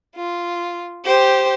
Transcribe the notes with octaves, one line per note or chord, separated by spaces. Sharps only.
F4
G4 C5